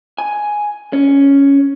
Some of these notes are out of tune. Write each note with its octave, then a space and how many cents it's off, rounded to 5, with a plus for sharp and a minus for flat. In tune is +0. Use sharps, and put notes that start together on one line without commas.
G#5 +5
C#4 +5